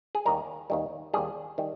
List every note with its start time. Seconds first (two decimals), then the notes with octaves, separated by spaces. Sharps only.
0.15 G#4
0.25 D#2 D#3 G3 A#4
0.70 D#2 D#3 G3
1.14 D#2 D#3 G3 G#4
1.58 D#3 G3